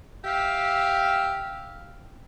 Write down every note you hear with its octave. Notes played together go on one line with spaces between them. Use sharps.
G4 E5 F5